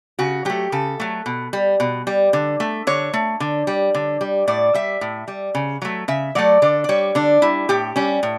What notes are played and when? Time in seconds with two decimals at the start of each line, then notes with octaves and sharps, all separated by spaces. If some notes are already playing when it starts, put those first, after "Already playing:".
0.19 C#3 F#4
0.45 F#3 A3 G4
0.72 C#3 A4
1.00 F#3 A3
1.26 B2
1.53 G3
1.80 B2
2.07 G3
2.33 D3
2.60 A3
2.87 D3 C#5
3.13 A3
3.40 D3
3.67 G3
3.94 D3
4.21 G3
4.48 A2 D5
4.74 G3 E5
5.01 A2
5.28 G3
5.55 C#3
5.82 F#3 A3
6.08 C#3 E5
6.35 F#3 A3 D5
6.62 D3 D5
6.84 D5
6.89 G3 C#5
7.15 D3 D4
7.42 G3 E4
7.69 A2 G4
7.96 G3 C#4
8.23 A2